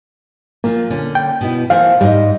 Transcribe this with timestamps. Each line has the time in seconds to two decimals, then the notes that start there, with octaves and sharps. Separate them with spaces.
0.64 A#2 F3 A#3 F4
0.90 D3 C#4
1.15 G5
1.41 B2 B3 E4
1.70 E3 A3 C5 F5
2.01 G#2 G3 G#4 D#5